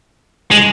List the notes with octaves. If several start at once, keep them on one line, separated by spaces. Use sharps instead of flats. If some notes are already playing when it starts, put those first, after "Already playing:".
G#3